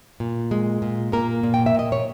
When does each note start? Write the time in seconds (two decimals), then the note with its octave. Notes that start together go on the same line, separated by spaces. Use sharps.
0.20 A#2
0.51 G#3
0.82 A#2
1.12 A#2 A#3 A#4
1.43 A#2
1.54 G5
1.66 E5
1.74 A#2 D#5
1.92 C#5